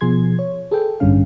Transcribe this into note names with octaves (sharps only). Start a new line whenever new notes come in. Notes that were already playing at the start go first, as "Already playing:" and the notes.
B2 F3 G#4 C6 G#6
C#5
G#4 A4 B4 G5
A1 G2 D3 G3 C#4 F5